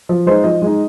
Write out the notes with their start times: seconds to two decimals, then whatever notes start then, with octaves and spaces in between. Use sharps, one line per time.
0.09 F3
0.26 G#3 D#4 C5
0.44 F3 D#5
0.62 G#3 D#4